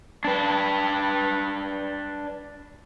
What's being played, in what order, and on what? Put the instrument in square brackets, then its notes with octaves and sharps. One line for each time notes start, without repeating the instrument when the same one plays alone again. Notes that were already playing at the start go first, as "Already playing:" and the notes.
[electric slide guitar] D4 B4